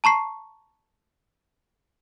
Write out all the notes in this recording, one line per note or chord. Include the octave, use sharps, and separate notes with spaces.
A5 A#5 C#6 C7